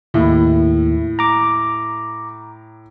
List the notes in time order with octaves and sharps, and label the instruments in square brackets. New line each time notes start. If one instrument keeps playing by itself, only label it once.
[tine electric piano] D#2 E4 [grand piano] A2
[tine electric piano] A#5 D6